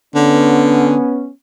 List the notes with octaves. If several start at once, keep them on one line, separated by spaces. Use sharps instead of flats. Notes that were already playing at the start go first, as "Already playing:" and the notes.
D3 B3 C#4